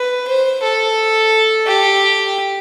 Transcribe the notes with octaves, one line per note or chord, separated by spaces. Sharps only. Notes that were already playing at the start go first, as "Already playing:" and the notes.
Already playing: B4
C5
A4
G4